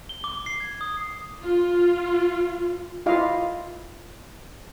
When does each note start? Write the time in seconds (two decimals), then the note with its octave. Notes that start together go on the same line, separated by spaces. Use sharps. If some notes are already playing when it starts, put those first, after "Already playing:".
0.09 G7
0.24 D6
0.46 C7
0.60 G#6
0.81 D#6
1.42 F4
3.06 E4 F4 D#5 F5